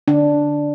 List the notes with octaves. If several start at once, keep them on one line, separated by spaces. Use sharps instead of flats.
D3 D4
D3